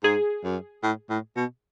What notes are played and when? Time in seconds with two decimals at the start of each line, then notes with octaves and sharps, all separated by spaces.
0.03 G#2 G#4
0.44 F#2
0.83 A2
1.10 A2
1.36 B2